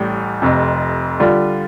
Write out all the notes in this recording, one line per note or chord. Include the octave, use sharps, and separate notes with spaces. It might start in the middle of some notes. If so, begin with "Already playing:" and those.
Already playing: A1 A2 G3
F1 F2 C3
D3 G3 F4